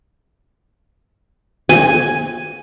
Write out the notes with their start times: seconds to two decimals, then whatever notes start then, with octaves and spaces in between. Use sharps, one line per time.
1.69 G#5